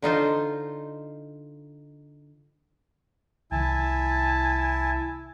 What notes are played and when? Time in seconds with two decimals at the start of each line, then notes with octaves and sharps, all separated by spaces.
0.02 D3 D#4 F4 C5
3.52 C2 D#3 E4 G#5 A5